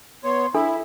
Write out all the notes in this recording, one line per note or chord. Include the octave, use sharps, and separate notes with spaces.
B3 C#5 C6
D4 E4 A4 E5